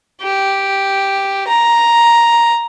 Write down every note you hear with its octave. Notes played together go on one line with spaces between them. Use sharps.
G4
A#5